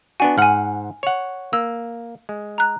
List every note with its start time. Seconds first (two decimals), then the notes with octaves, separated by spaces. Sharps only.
0.20 B3 D4 F#4 G#5
0.38 G#2 F#5 G#5 F6
1.03 C#5 F#5
1.53 A#3 E6
2.29 G#3
2.58 A#5 F#6